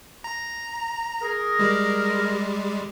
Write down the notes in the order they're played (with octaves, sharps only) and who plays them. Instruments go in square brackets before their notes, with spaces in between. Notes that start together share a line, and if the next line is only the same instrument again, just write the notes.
[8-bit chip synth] A#5
[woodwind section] G#4 A#4
[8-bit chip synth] G3 G#3